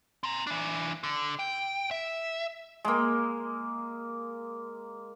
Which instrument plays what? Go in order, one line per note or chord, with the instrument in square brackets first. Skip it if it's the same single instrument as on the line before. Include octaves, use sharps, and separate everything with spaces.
[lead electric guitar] C4 A#5
E3 D4
D3
G5
E5
[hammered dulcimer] G#3 A#3